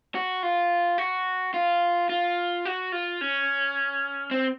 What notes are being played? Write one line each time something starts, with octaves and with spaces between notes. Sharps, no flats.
F#4
F4
F#4
F4
F4
F#4
F4
C#4
C4